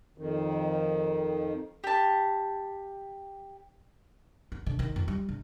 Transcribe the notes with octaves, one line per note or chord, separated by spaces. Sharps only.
F2 D#3
G4 A5
B3
D3
D#3
F2
G3
D3